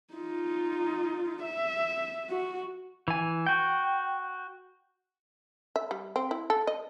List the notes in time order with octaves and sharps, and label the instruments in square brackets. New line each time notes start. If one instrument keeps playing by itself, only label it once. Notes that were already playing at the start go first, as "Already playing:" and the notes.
[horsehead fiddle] D#4 F4
E5
F#4
[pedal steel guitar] E3 G#5
F#4 G5
[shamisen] E5
G3
C4
E4
A4
D#5